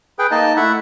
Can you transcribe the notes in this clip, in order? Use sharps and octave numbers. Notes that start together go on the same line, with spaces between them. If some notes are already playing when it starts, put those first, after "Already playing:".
G#4 B4 G5
A#3 D#4 D#5 A5
A3 E4 E5 F#5